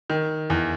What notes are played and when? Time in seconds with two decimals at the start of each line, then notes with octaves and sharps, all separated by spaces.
0.10 D#3
0.50 E2